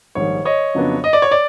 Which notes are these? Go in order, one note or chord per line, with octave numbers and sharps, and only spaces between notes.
A#1 G#2 D#3 G3 C#5
C#5 D#5
F2 C#3 F#3 B3 D4
D#5
D5
C#5
D5